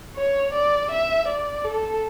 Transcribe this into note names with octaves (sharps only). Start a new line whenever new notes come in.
C#5
D5
E5
D5
A4